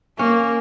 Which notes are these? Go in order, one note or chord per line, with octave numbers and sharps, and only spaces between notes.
A#3 C#4